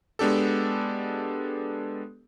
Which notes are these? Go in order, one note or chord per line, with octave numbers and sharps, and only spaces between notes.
G#3 B3 D4 G4 A4